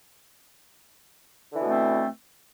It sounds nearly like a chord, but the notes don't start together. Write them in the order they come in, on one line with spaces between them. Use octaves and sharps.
D3 E3 B2 A3 C4